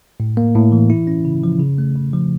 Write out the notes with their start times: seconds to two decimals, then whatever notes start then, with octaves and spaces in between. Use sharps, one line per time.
0.20 A2
0.37 A#3
0.55 A2
0.72 E3
0.90 E4
1.07 C#4
1.25 C#3
1.43 F3
1.60 C#3
1.78 A3
1.95 C#3
2.13 F3